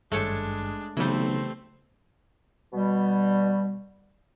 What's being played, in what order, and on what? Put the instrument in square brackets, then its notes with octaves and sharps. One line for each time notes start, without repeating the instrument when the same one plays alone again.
[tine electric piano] G#1 G2 [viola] G#3 D4 [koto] A3 C#5 A5
[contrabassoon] B1 [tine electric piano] C#3 [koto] E3 G3 [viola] A3 C4
[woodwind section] B2 G3